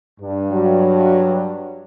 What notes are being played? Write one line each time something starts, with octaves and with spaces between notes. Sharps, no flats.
G2 D4
F#3